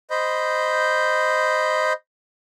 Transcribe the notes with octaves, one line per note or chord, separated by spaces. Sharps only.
C5 D#5 B5 G6